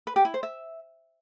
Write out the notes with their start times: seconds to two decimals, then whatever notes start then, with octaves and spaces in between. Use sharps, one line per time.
0.07 B4
0.16 G4
0.25 E4
0.34 C5
0.43 E5